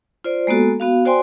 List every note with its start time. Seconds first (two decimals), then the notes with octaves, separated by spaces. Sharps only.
0.24 F4 C5 D5
0.47 G#3 A#3 B3 F#4 A4
0.80 B3 F#4 F5
1.05 F#4 C5 D5 G5 G#5 C6